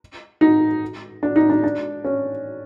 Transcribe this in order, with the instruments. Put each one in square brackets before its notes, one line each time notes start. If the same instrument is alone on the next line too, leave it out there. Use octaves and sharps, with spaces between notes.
[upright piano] D#4
D4
D#4
D4
D4
C#4